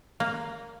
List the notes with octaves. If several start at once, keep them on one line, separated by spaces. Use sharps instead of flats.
A#3